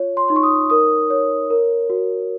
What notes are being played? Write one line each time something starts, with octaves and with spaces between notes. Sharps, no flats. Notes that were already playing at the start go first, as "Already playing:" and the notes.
Already playing: F4 C#5
C6
D#4 C6
C#6
D#6
A#4 D#6
C#5
A#4
F#4